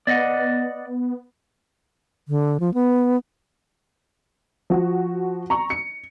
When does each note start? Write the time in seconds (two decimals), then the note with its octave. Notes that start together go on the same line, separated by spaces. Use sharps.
0.07 B3 D5 D#5 F#5
2.28 D3
2.60 F3
2.74 B3
4.70 F3 F#4
5.50 A#5 C#6
5.70 C#7